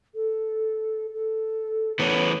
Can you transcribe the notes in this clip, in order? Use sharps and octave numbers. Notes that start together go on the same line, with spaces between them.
A4
A4
E3 A3 B3 C#5